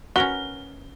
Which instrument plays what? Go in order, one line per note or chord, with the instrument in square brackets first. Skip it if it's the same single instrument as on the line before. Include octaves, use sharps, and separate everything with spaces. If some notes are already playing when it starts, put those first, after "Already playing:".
[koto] C#4 A#4 B4 [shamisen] F#4 [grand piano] G7